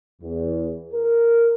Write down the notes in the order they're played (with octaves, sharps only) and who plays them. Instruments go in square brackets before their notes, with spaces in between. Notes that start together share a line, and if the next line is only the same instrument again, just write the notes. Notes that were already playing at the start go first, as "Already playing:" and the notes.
[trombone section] E2
A#4